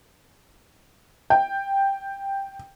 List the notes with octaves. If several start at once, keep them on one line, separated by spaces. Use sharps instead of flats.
G5